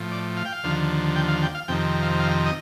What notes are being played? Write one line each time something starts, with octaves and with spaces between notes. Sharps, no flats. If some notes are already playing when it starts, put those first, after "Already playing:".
Already playing: A2 F3
D5
F5
G5
F5
D#2 D3 F3
G5
F5
G5
F5
F2 C3 D#3 G5
F5
F5
D#5